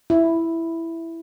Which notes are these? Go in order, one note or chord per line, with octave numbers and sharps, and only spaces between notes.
E4